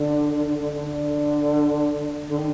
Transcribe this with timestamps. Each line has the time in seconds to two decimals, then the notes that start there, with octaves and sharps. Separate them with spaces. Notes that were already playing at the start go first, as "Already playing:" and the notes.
Already playing: D3
0.33 D3
0.45 D3
0.59 D3
0.72 D3
2.27 D3
2.37 D#3